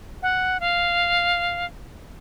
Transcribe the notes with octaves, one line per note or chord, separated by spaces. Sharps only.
F#5
F5